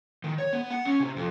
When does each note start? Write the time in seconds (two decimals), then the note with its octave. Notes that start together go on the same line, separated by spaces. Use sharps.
0.24 D#3
0.38 C#5
0.53 B3
0.71 F#5
0.85 C#4
1.00 C3
1.16 F2